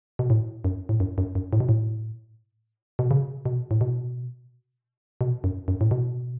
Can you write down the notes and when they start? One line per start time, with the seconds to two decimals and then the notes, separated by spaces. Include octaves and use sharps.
0.19 B2
0.30 A2
0.64 F#2
0.89 A2
1.00 F#2
1.18 F#2
1.35 F#2
1.53 A2
1.60 B2
1.69 A2
2.99 B2
3.11 C#3
3.46 B2
3.71 A2
3.81 B2
5.21 B2
5.44 F#2
5.68 F#2
5.81 A2
5.91 B2